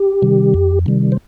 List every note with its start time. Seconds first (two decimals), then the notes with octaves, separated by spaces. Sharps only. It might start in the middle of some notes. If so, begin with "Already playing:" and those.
Already playing: G4
0.22 C3 D#3 G3
0.54 F2
0.86 C3 D#3 G3
1.12 C5